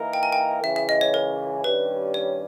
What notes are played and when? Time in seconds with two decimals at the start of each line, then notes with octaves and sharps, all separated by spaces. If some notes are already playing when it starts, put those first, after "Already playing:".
Already playing: E3 A#3 D#4 A#4
0.13 G5
0.23 G#5
0.32 G5
0.63 C#2 C#3 E3 E5
0.76 E5
0.89 D#5
1.01 C#5
1.14 A#4
1.64 G2 D#3 G3 C#4 B4
2.14 C#5